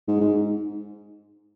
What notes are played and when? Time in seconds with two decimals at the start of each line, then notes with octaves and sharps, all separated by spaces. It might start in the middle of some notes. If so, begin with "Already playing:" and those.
0.08 G#2
0.20 G#2